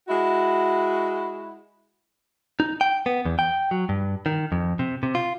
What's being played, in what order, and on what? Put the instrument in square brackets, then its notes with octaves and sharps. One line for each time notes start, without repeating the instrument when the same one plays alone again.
[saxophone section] G#3 E4 F#4
[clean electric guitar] D#4
G5
B3
E2
G5
F#3
G2
D#3
F2
C3
C3
F4